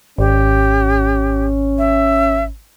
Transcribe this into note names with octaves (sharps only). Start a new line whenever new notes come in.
G#1 C#4 G4
E5